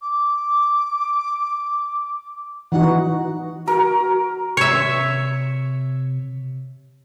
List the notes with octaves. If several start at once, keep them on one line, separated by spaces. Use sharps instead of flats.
D6
E3 D#4 F#4 F#5
F#4 A#4
C3 C#5 E5